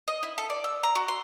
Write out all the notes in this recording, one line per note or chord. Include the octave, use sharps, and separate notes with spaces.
D#5
E4
A4
D5
E6
A#5
F#4
C6